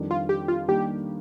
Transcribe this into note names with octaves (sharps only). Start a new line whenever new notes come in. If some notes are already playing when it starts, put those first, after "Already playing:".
Already playing: F2 D#3 G3 D4
F4
G4
F4
D#3 G3 A#3 D4 G4